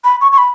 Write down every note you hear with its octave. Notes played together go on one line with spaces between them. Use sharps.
B5
C#6
C#6
B5